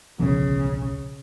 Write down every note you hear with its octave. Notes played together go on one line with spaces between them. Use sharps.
D1 B1 C#3 F3